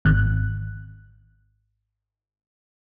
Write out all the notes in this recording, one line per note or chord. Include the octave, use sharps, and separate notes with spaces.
G#1 F#6